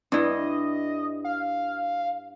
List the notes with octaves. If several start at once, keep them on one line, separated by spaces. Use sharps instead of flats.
G2 D4 E4 D#5
F5